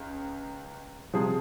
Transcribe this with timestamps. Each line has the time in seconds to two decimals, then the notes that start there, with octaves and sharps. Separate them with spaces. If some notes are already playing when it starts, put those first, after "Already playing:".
Already playing: C#2
1.14 C3 F3 G#4